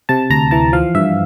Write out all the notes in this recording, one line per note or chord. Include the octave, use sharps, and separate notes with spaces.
C3 A5
D2 A#5
E3 A5
F3 F5
G2 E5